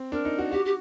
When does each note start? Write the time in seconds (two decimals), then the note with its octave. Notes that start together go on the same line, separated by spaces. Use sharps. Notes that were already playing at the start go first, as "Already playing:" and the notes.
Already playing: C4
0.12 D4 A#4
0.25 D#4
0.38 F#4
0.52 F#4 G4
0.65 G4